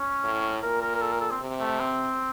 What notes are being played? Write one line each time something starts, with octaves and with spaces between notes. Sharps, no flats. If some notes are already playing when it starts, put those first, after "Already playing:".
Already playing: C#4
A2
A#2 A#4
A#4
A#4
A4
A#4
A4
C4
C3
A3
C4